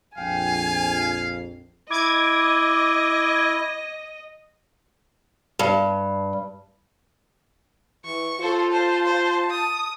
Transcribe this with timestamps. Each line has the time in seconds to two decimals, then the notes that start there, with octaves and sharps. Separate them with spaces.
0.18 A#1 F2 F5 G5 G#5
1.90 E4 D#5 D6 G#6
5.59 G2
8.05 E3 C#6
8.41 F4 A4 C5
8.72 C5 A5
9.05 C5
9.51 D#6